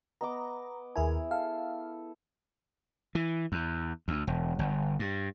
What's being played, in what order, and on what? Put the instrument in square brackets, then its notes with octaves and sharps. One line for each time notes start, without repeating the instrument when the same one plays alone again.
[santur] B3 D#5 D6 [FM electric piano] A#5
[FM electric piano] D#2 A#4 G#5 [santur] E4 G#4
[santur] A4 [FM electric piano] F5
[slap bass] E3
E2
D2
E1
G1
G2